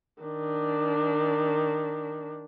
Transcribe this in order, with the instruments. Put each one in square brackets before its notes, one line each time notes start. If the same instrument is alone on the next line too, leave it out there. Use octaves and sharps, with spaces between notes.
[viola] D#3 D4